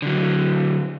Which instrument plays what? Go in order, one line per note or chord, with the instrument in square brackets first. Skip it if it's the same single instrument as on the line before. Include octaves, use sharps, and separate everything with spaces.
[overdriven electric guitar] D3 F#3